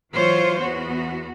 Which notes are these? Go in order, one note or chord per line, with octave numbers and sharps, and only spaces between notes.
E3 F#3 F4 C5 C#5
E2 B3 F#4